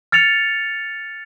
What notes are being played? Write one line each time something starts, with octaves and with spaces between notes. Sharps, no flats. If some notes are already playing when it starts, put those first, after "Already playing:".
F6 A6 C#7 F7